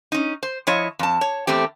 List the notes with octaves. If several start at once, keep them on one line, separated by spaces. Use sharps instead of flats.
C#4 D#4
C5
F3 E4 C#5 D#5
F2 A5
C#5
E2 A3 C4 G4